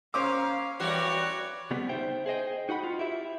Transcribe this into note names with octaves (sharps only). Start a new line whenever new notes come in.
A#3 C#4 C5 F5 D6
E3 G3 F#4 C#5 D5
C#3 G3 B3 C4
D#4 C5 E5 G5
G#4 C5 D#5 G5
D#4 F#4 F#5 B5
F4
E4 G4 E5